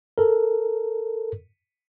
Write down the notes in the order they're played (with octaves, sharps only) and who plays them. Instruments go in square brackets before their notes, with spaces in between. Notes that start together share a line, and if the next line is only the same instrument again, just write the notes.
[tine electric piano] A4 A#4